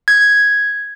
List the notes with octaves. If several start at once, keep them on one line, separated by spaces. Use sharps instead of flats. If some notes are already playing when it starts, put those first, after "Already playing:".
G#6